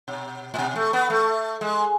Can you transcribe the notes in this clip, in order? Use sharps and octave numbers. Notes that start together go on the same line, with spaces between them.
B2
A2
B2
A3
B3
A3
G#3